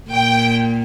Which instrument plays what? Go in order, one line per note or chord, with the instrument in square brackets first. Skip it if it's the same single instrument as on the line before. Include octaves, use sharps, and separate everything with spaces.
[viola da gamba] A#2 [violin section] G5